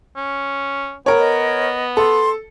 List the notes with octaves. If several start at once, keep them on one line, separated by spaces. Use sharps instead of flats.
C#4
B3 A#4 C#5
D#5
A4 C6